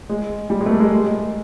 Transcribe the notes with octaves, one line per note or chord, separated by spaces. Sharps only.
G#3
G3
G#3
A3
A#3
G#3
G#3